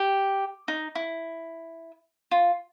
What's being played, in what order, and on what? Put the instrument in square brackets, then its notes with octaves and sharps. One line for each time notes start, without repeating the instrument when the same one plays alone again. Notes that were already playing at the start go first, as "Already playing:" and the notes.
Already playing: [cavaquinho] G4
D#4
E4
F4